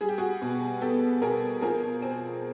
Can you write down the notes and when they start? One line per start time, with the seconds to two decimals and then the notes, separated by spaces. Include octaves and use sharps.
0.01 G3 G#4
0.09 G4
0.18 F#4 G#4
0.42 B2
0.81 B3 G4 A4
1.22 B2 G#4 A#4
1.62 F3 G#4 A#4
2.02 C4